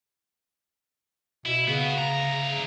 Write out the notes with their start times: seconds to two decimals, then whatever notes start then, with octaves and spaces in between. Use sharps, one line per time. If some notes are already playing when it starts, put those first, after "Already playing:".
1.46 B2 E4
1.68 C#3 B3 F#4
1.98 D2 A#5